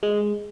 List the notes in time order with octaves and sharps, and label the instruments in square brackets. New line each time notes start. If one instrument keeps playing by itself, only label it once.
[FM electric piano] G#3